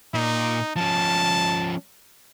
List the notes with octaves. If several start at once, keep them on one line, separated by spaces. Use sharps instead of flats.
A#2 D#4
F3 C#4 A5